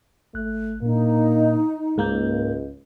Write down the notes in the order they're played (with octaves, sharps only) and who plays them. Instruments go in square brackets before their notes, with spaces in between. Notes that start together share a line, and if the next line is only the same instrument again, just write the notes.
[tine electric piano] G#1 F#6 [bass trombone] A3
[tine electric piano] A#2 D4 [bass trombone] A#3 [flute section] D#4
[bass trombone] C#2 [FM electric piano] G#2 A#3 [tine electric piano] A#4 G6